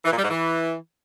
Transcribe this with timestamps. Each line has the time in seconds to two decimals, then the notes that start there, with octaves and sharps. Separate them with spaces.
0.05 E3
0.11 A#2
0.17 G3
0.24 G#2
0.30 E3